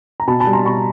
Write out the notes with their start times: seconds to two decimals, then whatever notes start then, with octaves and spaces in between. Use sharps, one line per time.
0.20 A#5
0.27 B2 A5 B5
0.40 A5 B5
0.47 G3
0.53 A#5 C6
0.66 B2 B5 C#6